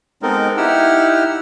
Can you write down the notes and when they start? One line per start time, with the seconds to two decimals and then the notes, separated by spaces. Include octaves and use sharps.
0.22 G#3 B3 C4 D#4 A4 A#4
0.57 D#4 E4 G4 F#5 E6 F6